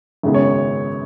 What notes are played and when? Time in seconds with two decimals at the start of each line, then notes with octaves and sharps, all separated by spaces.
0.23 G#1 F#2 C#3 G#3 B3
0.34 C#5